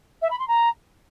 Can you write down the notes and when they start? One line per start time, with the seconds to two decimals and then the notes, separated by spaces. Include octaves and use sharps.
0.22 E5
0.30 B5
0.39 C6
0.48 A#5